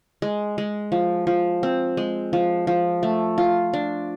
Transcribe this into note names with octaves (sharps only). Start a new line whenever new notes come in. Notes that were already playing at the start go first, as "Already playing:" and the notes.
G#3
G#3
F3
F3
C4
G#3
F3
F3
A3
F4
D4